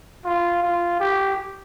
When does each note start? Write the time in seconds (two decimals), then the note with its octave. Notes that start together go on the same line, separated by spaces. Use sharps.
0.25 F4
0.63 F4
1.00 G4